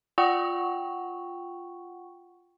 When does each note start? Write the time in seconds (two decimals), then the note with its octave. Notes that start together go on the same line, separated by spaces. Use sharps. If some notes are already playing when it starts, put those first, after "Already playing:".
0.18 F4 F#5 G5 C#6